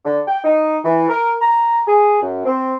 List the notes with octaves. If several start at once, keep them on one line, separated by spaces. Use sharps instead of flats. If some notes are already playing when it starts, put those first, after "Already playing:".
D3
G5
D#4
E3
A#4
A#5
G#4
F#2
C4